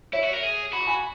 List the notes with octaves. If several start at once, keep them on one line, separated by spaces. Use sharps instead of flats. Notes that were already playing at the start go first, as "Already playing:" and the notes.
E4 C#5 E5
F#4
A#4
G#4
F#4 B5
C#6
G#5 B5